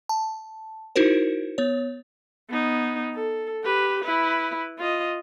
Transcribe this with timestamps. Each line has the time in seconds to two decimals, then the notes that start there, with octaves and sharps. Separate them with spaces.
0.09 A5
0.96 D#4 E4 F#4 A#4 C5
1.58 B3 C#5
2.49 B3 D#4
3.15 A4
3.63 G4 B4
4.03 E4 B4
4.78 F4 D#5